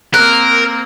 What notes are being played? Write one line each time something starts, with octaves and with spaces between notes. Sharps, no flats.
A#3 C4 A#4 F#6